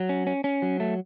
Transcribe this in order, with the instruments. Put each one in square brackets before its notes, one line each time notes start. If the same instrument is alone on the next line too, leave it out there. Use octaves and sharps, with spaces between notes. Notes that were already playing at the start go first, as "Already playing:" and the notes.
Already playing: [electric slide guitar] F#3
C#4
C#4
C#4
F#3
A3